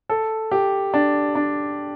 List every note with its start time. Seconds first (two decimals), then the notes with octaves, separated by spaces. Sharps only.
0.09 A4
0.52 G4
0.94 D4
1.35 D4